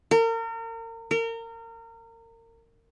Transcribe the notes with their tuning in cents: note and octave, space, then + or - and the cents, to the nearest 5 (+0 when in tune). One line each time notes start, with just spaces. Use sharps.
A#4 -35
A#4 -30